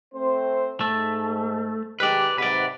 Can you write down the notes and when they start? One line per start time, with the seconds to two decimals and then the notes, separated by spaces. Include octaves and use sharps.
0.14 A3 C4 C5
0.81 G#2 A3
2.00 D#3 G#3 G4 B4 D5
2.38 G#2 C3 B4 D5 F#5